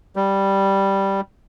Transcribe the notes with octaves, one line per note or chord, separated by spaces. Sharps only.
G3